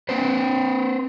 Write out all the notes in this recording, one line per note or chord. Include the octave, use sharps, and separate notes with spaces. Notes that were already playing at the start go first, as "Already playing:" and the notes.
C4 B4 C5